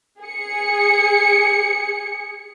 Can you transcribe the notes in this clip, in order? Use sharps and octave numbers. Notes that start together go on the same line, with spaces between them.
G#4 C#7